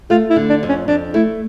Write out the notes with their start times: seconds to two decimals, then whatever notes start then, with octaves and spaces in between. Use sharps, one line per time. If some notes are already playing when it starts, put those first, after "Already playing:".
0.10 A3 F4
0.30 E4
0.36 D3
0.49 D4
0.63 F2
0.69 C#4
0.88 F2 D4
1.14 A3 E4